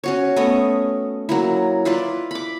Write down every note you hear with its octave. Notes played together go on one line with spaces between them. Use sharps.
C#4 F#4 C#5
A3 B3 C#4 D#5
F#3 A#3 E4
E4 F4 B4 D5
B5 D6